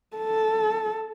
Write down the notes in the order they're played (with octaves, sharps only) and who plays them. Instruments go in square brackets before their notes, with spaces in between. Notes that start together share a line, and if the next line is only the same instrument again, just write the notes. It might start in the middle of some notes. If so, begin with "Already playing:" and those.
[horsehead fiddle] A4